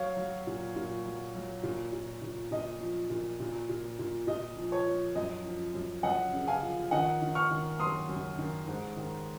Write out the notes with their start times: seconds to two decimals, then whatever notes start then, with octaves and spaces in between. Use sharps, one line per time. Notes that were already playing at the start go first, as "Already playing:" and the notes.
Already playing: F#3 C#5 F5
0.17 F#3
0.47 A#2
0.76 A#2
1.05 F#3
1.35 F#3
1.63 A#2
1.92 A#2
2.22 A#2
2.51 A#2 D#5
2.80 F3
3.10 A#2
3.40 A#2
3.69 A#2
3.99 A#2
4.27 A#2 D#5
4.57 F3
4.72 C#5
4.87 F3
5.15 F#2 D#5
5.46 F3
5.74 F#2
6.03 F#2 D#5 F#5
6.33 C#3
6.48 F5 G#5
6.63 F3
6.91 D#3 D#5 F#5
7.22 D#3
7.35 C#6 F6
7.51 D#3
7.80 F#2 C6 D#6
8.09 F#2
8.38 D#3
8.67 G#2
8.96 D#3